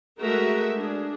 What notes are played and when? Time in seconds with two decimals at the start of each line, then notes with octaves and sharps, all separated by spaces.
0.19 G#3 A3 F#4 A#4 E5
0.77 D4 G#4